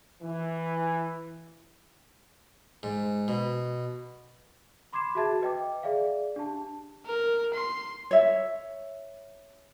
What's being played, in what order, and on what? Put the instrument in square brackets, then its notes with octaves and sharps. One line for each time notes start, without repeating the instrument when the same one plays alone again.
[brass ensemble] E3
[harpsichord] G#2
B2
[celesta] B5 C6 D6 G#6 C7 E7
F#4 G#4 E5 A5 G#6 A6
B4 D#5 G5 D6
G#4 D5 E5 F5
D4 G4 A5
[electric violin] A#4
C6
[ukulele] C#5 E5